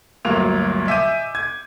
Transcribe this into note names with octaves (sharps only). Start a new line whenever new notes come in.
G1 D2 F#3 A#3 F7
D#5 E5 G#5 D6 G6 D#7
G#6